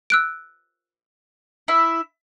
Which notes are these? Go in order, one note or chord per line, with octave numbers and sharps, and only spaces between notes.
E6 F#6 D7
E4 E5